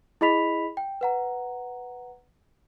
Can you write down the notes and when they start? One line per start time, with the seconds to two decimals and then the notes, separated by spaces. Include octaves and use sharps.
0.21 E4 G#4 D#5 B5 B6 F7
0.77 G5
1.01 B4 F#5 A#5